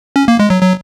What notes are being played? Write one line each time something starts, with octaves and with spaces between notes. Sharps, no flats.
C#4
A#3
G#3
F#3
F#3